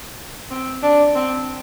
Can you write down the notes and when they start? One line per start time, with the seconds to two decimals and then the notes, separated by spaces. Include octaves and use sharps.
0.51 C4
0.83 D4
1.15 C4